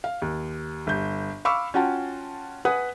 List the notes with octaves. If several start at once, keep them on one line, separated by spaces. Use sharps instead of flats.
F5
D#2
G1 G6
F5 B5 C#6 D6 E6
C#4 F4 F#4 F#5 G5 A5
B4 F#5 G#5 D#6